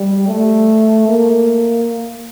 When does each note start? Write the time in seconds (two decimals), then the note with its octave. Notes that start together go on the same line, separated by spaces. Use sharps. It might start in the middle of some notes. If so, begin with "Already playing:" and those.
Already playing: G3
0.28 A3
1.09 A#3